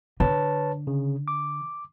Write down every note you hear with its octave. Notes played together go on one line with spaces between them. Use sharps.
D3 B4 C#5 A5
C#3
D6